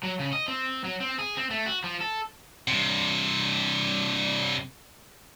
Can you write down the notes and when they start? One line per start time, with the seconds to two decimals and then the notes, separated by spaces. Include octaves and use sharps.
0.03 F#3
0.19 C#3
0.33 D#5
0.48 C4
0.84 F#3
1.00 C4
1.19 G#4
1.37 C4
1.51 A3
1.66 F#4
1.84 F3
2.01 A4
2.68 G2 C3